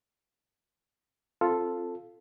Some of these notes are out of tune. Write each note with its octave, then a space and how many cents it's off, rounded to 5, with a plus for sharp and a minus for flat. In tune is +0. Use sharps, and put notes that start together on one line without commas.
C4 +15 F4 +0 A4 +0